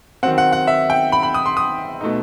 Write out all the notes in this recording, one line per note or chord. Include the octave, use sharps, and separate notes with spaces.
D#3 F#3 C4 F#5
F#5
F#5
E5
G5
B5
B5
D#6
C6
D#6
B2 A3 D#4